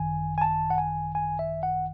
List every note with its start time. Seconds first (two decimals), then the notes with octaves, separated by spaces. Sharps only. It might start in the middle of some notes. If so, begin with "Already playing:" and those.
Already playing: G#1 F#2 D#3 G#5
0.38 G#5
0.41 A5
0.70 F#5
0.78 G#5
1.15 G#5
1.39 E5
1.63 F#5